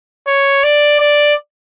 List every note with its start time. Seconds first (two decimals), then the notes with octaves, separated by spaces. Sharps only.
0.27 C#5
0.64 D5
1.00 D5